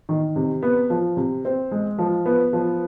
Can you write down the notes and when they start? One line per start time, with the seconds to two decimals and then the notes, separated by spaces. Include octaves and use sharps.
0.09 D#3
0.36 C3
0.63 B3
0.90 F3
1.17 C3
1.45 C4
1.71 G#3
1.98 F3
2.26 B3
2.53 F3